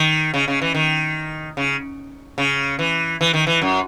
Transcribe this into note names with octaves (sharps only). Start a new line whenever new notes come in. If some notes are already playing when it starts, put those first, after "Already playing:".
Already playing: D#3
C#3
C#3
E3
D#3
C#3
C#3
E3
E3
D#3
E3
F#2